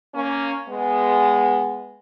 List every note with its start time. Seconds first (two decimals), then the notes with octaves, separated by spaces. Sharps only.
0.14 A#3 C#4
0.68 G#3 B3